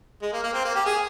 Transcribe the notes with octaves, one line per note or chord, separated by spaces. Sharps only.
G#3
A#3
A#3
C4
A#3
G4
G#4